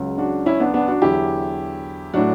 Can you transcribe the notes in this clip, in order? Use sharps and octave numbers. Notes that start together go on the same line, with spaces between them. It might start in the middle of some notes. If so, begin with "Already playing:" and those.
Already playing: C#2 C#3 F#3
D4 F#4
C#4 E4
B3 D4
B3 D4
D4 F#4
E2 D3 F#3 E4 G4
A2 F#3 D4 F#4